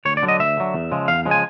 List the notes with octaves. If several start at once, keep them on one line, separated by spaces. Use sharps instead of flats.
D2 C#5
D5
D3 F#3
D#5
D2 E5
D3 F#3
E2
C#3 F3 G#3
E2 F5
C#3 F3 G#3
G#5